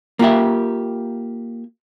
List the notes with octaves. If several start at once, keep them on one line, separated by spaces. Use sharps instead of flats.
A#3 F4 G4 E5